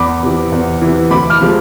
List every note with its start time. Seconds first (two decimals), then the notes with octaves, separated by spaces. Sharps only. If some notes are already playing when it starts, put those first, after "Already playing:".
Already playing: E2 B5 D6
0.23 C3 E3
0.52 E2
0.82 C3 E3
1.11 D2 B5 D6
1.30 D6 F6
1.40 C3 F3 G#3